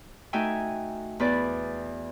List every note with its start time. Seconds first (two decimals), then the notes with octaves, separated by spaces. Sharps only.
0.33 A3 D#4 F#4 E5 G5 G#5
1.20 E2 B4 D5